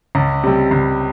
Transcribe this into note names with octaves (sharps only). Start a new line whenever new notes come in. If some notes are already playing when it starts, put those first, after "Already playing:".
C#2
C3 G3
C#2